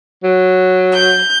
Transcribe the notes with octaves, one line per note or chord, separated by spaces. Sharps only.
F#3
G6